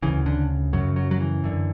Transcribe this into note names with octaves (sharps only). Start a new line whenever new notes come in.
D2 C#3 E3
D3
F#2 C#3 F#3
F#3
F#3
E3
F#2 D3